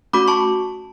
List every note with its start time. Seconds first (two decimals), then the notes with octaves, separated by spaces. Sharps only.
0.13 A3 C#4 F#4 B5 D6
0.28 A5 C#6